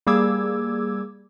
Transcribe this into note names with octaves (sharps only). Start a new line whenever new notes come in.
G3 A#3 G#4 D6 E6 G#6